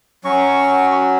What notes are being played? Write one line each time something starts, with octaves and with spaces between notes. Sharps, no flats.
F#3 C#4 F#4 C#6